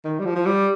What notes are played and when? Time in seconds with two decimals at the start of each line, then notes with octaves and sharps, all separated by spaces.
0.05 D#3
0.19 G3
0.25 F3
0.36 F3
0.46 G3